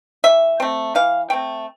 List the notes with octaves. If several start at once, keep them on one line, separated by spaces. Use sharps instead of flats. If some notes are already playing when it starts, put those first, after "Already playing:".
E3 E5
A3 C4
E3 F5
A3 C4 G5